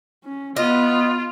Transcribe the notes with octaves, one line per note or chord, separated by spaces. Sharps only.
C#4
B3 F4 D#5